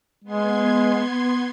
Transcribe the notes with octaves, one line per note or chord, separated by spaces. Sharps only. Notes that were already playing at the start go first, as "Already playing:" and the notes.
G#3 B3 C6 G#6